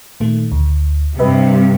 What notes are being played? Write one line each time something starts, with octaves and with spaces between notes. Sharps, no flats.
A#2 D#3 A3
D2
G2 C3 B4 D#5 E5